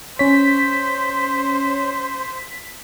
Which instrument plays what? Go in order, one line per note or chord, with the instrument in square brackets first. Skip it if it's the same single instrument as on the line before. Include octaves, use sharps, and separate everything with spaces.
[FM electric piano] C#4 C#5 [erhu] C5 [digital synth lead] B6